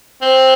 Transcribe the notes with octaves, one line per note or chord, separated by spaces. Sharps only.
C4